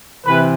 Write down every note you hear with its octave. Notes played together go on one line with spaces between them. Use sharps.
C3 E3 B4